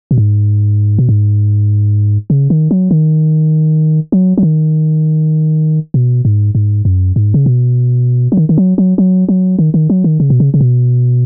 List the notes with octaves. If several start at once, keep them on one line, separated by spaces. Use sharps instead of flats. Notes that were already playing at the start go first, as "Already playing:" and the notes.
B2
G#2
B2
G#2
C#3
D#3
F#3
D#3
F#3
F#3
D#3
B2
G#2
G#2
F#2
G#2
C#3
B2
F#3
D#3
D#3
F#3
F#3
F#3
F#3
D#3
D#3
F#3
D#3
C#3
B2
C#3
C#3
B2